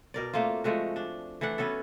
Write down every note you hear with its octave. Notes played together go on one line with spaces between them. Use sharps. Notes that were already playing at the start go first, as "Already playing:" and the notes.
B2 A#4 D5
A3 A#3 C4 F4
F3 G#3 A3 F#4
D4
E3 A3 D4 F#5
B3 C#4 F#4 A4